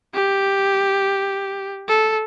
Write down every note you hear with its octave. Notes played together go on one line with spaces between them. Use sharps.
G4
A4